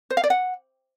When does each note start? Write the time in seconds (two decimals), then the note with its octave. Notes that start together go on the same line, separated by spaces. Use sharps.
0.10 C5
0.17 F5
0.24 D5
0.30 F#5